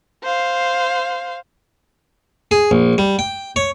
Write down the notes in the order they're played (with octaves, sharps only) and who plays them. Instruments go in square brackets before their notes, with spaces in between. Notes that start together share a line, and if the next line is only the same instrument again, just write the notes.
[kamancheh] C5 F5
[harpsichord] G#4
A#1
G3
G5
C#5